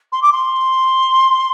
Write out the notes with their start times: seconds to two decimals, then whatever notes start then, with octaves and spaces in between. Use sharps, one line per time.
0.12 C6
0.22 D6
0.32 C6